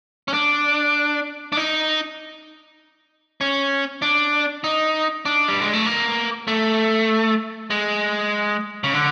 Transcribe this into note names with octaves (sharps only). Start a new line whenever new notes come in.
C#4
D4
D4
D#4
C#4
D4
D#4
D4
G3
G#3
A3
A#3
A3
G#3
C#3
D3